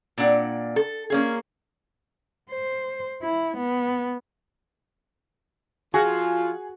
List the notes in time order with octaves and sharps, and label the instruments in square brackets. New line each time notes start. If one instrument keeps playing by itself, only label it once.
[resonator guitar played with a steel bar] A#2 C4 D4 F#5
A4
A#3 C#4 G#4
[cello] C5
E4
B3
[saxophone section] F3 F4 [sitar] F#4 [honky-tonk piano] G#4